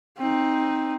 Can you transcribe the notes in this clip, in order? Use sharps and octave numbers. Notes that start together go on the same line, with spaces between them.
C4 D#4